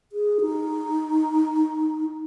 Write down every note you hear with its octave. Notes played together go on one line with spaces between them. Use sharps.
G#4
D#4